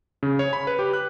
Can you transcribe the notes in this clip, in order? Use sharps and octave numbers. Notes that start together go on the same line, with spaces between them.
C#3
C#5
B5
B4
G4
F#6